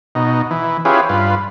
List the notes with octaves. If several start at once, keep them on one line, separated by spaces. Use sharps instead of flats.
B2 D#4
E3
C#4 E4 F4 G4 G#4 B4
G2 F4 B4